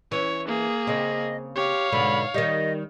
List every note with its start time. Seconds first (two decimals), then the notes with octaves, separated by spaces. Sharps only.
0.12 E3 C#4 C#5
0.47 A#3 G#4
0.87 C#3 C4 D#5
1.56 G4 C#5 F5
1.92 G#2 B2 D3 B5
2.34 D#3 G3 D#5